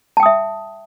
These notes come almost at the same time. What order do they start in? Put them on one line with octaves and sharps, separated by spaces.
A5 G5 D#6 E5